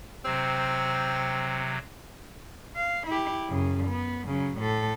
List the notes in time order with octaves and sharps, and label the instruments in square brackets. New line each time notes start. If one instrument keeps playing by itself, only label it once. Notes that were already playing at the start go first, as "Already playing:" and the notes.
[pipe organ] C3 F#3 [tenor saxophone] C4
[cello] F5
E4 G4
F#2 C#3
B3
C#3 F#3
A2 A4